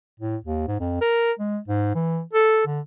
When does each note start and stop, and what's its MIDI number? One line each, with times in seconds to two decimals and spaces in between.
0.20 0.37 45
0.44 0.65 39
0.68 0.79 44
0.80 1.01 41
1.01 1.32 70
1.39 1.58 56
1.68 1.90 44
1.95 2.21 52
2.33 2.67 69
2.67 2.80 50